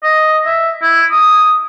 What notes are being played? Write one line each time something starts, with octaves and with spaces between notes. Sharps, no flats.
D#5
E5
E4
D#6